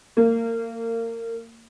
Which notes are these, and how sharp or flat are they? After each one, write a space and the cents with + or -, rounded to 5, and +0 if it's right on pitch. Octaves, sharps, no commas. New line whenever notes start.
A#3 -30